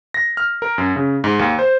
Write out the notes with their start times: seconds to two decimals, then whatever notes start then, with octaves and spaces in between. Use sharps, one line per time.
0.14 A#6
0.37 F6
0.62 A#4
0.78 F#2
0.96 C#3
1.24 G#2
1.39 D#2
1.59 C5